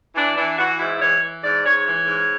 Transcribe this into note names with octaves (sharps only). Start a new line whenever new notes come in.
E3 D4
E3 D4
E3 F#4
G#2 E4
E3 C#5
E3
G#2 D5
G#2 C#5
E3 C#5
G#2